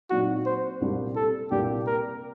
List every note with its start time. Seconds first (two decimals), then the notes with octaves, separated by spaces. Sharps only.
0.10 A#2 F#3 C4 D#4 F#4
0.46 C5
0.81 C2 A#2 G3 A#3 D4
1.16 A4
1.51 C2 A#2 G3 A#3 D4 G4
1.87 A#4